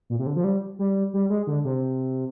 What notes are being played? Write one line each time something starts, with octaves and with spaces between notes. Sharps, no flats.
A#2
C3
D3
F3
G3
G3
G3
G#3
D3
C3